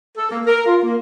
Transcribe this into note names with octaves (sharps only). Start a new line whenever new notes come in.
A4
A#3
A#4
F4
A#3